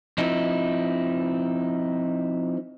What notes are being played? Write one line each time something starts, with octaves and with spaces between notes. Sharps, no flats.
F3 C4 D#4 E4